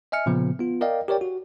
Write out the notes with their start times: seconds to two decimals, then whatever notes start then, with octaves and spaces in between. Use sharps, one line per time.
0.12 D#5 E5 G#5 F6 C#7
0.26 A#2 C#3 F3 B3
0.59 B3 F4
0.81 A#4 D5 D#5 F5 G5
1.08 G4 A#4 C#5 D5 G5
1.21 F#4